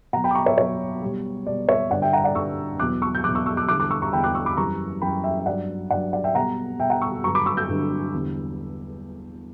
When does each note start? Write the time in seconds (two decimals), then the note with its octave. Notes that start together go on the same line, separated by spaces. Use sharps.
0.13 B2 F#3 F#5 A#5
0.24 G5 B5
0.31 D6
0.35 A#5 C#6
0.46 C#5 E5
0.58 B2 F#3 C#5
1.02 B2 G3
1.46 B2 G3 D5
1.68 C#5 E5
1.91 G2 D3 G3 D5 F#5
2.02 E5 G5
2.13 F#5 A#5
2.24 D5 F#5
2.35 G2 D3 G3 C#6 E6
2.79 E2 B2 F#3 D6 F#6
3.02 C#6 E6
3.15 G6
3.24 E2 B2 F#3 D6 F#6
3.35 C#6 E6
3.46 C#6 E6
3.57 D6 F#6
3.68 E2 D3 G3 D6 F#6
3.80 D6 F#6
3.91 C#6 E6
4.02 A#5 C#6
4.13 E2 D3 G3 G5 B5
4.24 D6 F#6
4.35 C#6 E6
4.46 B5 D6
4.57 F#2 E3 G3 A#5 C#6
5.02 F#2 E3 G3 G5 B5
5.24 E5 G5
5.39 E5
5.46 G2 F#3 D5 F#5
5.90 G2 F#3 D5 F#5
6.13 D5 F#5
6.24 E5 G5
6.35 B2 G3 F#5 A#5
6.79 B2 G3 E5 G5
6.90 F#5 A#5
7.01 C#6 E6
7.24 G2 D3 F#3 A#5 C#6
7.35 B5 D6
7.46 C#6 E6
7.57 E6 G6
7.69 G2 D3 F#3
8.13 E2 D3 G3